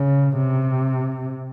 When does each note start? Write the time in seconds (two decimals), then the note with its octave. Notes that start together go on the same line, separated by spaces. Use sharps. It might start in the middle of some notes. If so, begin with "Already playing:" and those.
Already playing: C#3
0.37 C3